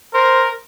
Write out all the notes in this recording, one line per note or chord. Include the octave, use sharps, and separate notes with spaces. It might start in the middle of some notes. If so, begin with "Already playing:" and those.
A#4 C5